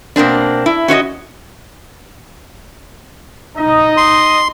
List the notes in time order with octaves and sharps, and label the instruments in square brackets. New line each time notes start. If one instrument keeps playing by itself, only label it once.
[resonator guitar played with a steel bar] B2 A#3 C4 D4
E4
C#4 F#4 C#5 D#5
[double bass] D#4 [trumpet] D#5
[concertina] C6